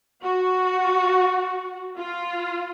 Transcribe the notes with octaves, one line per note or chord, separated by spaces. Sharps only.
F#4
F4